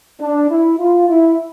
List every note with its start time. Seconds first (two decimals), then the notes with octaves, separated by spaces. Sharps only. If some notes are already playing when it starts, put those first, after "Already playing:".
0.20 D4
0.50 E4
0.79 F4
1.09 E4